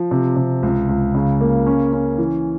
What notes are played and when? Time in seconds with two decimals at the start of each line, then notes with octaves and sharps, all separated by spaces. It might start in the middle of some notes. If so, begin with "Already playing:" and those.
Already playing: F3
0.11 C3
0.36 C3
0.63 C#2
0.89 C#2
1.15 C#3
1.41 A#3
1.66 C#4
1.93 C#4
2.18 E3